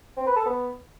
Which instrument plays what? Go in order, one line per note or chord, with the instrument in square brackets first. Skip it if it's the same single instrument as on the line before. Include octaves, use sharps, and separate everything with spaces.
[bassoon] C4
B4
A4
B3